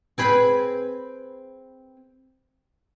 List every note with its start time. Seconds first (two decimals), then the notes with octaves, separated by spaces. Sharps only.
0.18 C4 G#4 B4